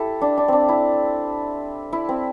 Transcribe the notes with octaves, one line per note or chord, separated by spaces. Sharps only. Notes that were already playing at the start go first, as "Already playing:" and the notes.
Already playing: E4 G4 A4
D4
D4
C4 D4
E4
E4
C4